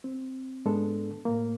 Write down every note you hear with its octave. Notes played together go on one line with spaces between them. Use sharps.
C4
G#2 G#3 B3 D4 A4
A2 A#3